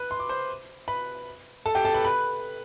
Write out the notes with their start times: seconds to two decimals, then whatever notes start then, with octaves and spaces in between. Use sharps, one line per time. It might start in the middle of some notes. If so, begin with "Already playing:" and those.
Already playing: B4 B5
0.11 C6
0.19 D6
0.29 C5 C6
0.88 B4 B5
1.66 A4 A5
1.75 G4 G5
1.85 A4 A5
1.94 B4 B5
2.04 B4 B5